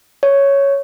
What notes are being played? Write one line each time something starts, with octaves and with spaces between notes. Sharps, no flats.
C#5